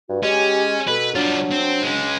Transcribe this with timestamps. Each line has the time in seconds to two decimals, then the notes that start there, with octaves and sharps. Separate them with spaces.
0.09 G2 F#4
0.23 G#3 C#4 G4
0.87 B2 A4 B4
1.15 F#3 G3 D4 F4
1.51 C4
1.83 G#3 C#4